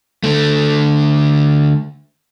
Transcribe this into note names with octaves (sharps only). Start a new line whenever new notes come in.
D3 A3